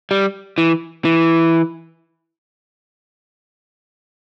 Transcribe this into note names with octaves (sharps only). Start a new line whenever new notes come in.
G3
E3
E3